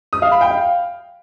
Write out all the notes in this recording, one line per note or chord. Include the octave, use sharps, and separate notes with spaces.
D#6
F5
B5
G5
F5